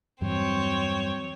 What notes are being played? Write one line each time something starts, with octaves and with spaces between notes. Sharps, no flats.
E2 G2 F#3 C4 C#5